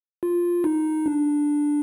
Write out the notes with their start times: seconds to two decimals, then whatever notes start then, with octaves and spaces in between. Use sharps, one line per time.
0.23 F4
0.64 D#4
1.06 D4